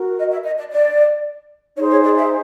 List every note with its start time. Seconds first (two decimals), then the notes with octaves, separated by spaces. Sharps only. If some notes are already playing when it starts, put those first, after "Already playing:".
Already playing: F#4 A#4
0.18 D#5
0.31 E5
0.45 D#5
0.58 D5
0.71 D5
1.77 D#4 G#4 C5 C#5
1.90 C#5
2.04 D5
2.17 E5